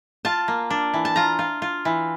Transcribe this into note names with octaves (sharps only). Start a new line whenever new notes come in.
F4 A5
A#3
D4
E3
A5
F4 A#5
F4
F4
E3